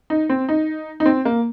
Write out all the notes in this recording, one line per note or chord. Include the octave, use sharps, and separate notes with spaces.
D#4
C4
D#4
D#4
C4
A#3